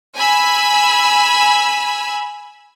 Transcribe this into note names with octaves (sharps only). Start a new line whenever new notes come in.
G#5 B5 E6